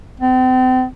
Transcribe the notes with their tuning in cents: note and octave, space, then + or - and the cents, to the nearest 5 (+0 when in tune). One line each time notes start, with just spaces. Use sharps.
C4 -40